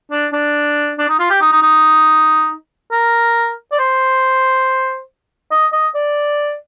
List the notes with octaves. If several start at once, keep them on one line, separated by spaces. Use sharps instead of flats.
D4
D4
D4
D#4
F4
G4
D#4
D#4
D#4
A#4
D5
C5
D#5
D#5
D5